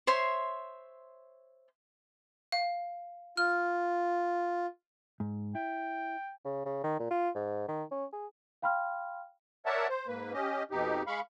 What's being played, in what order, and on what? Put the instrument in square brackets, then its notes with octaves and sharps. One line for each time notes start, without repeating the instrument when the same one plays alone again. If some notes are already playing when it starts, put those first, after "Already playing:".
[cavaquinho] C5 C#5 E5 C6
[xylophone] F5
[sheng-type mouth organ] F4 [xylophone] F6
[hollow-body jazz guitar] G#2
[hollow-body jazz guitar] E4 [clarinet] G5
[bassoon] C#3
C#3
D#3
A#2
F4
G#2
D#3
C#4
G#4
[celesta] F5 G5 B5 C6 F6
[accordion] A#4 C#5 D5 E5 F#5 A5
C5
G#2 A#3 B4
C#4 G4 D#5
F2 B2 D#4 G4
G#3 F5 B5 C#6